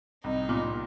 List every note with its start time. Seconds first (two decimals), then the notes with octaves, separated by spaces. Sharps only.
0.24 C2 D#4
0.49 A#2